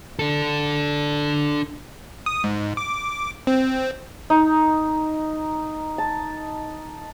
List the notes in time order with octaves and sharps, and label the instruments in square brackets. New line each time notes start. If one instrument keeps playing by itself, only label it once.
[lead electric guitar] D4 A4
[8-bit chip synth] D#6
G#2
D6
C4
[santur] D#4
A5